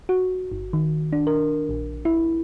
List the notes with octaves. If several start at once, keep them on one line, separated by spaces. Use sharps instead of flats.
F#4
G1
D#3
D4
A#4
A#1
E4